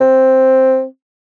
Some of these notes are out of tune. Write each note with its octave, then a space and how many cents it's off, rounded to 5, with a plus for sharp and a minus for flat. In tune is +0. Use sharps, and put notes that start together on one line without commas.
C4 +5